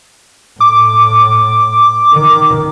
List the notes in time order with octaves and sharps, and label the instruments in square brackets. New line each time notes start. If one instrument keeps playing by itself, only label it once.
[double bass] A2 [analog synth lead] D6
[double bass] D#3